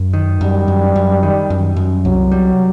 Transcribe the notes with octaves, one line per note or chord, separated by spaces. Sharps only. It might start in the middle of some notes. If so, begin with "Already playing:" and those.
Already playing: F#2
D#3
F#2 G3
F#2
F#2
D#3
F#2
F#2
C2 F#3
G3